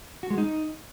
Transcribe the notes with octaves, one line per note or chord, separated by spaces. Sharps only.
F#4
G#3
D#4